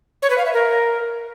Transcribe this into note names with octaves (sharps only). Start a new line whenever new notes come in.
C#5
B4
F5
E5
A#4